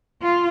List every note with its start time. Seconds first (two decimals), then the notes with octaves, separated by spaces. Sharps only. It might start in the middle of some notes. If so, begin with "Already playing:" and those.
0.22 F4